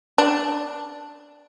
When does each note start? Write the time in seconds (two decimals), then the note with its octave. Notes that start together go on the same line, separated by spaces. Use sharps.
0.18 D4